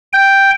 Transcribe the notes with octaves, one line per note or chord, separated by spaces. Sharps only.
G5